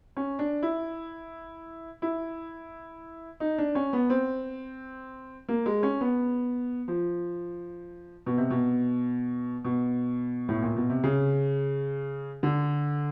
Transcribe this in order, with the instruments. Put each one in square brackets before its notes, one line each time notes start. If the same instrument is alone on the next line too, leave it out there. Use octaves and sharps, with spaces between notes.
[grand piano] C#4
D4
E4
E4
D#4
D4
C#4
B3
C4
A#3
G#3
C#4
B3
F3
B2
C3
B2
B2
A2
A#2
B2
C3
C#3
D3